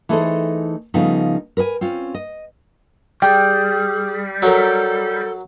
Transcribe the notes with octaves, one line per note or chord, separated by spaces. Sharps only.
E3 A3 D#4 G#4 A4 C5
C#3 F3 G3 A3 B3 D#4
A#4 B4 D5 G#5
C4 C#4 F4
D#5
G3 G#4 G5
F#3 A4 A#4